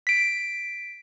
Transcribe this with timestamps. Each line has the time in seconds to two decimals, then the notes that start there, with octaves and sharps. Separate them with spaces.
0.07 B6 D7